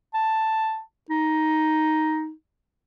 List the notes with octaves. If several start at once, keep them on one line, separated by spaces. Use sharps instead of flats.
A5
D#4